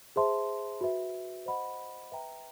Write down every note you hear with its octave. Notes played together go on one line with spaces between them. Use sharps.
G#4 C5 E5 A5 C6
F#4 B4 E5
C5 D#5 F#5 B5
B4 E5 G5 A#5